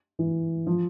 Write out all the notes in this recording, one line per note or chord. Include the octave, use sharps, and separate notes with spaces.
E3
F3